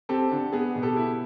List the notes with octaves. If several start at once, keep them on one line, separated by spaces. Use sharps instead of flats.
C4 G4 A4
D3
B3 G#4
B2
G4 A4
E4